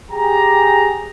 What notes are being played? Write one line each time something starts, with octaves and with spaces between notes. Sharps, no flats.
G4 G#4 A#5